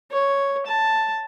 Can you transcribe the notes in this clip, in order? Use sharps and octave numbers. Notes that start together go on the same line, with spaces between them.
C#5
A5